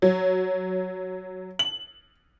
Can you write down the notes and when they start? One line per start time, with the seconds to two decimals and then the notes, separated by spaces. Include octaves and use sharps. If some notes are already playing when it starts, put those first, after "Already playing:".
0.02 F#3
1.59 F#7